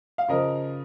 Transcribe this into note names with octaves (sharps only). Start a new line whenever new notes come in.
F5
C#3 F3 A#4 D#5